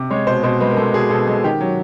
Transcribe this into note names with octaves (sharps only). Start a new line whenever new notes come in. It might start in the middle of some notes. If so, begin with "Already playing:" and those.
Already playing: C3
G#3 C#5
B2 C5
B2 C5
G#3 B4
A#4
G#3 A4
B2 G#4
B2 A4
G#3 A4
D#3 G4
F#3